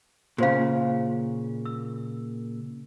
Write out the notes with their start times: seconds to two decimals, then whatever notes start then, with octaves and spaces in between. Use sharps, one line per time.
0.38 A#2 C#3 F#4 C5 F5
1.66 E6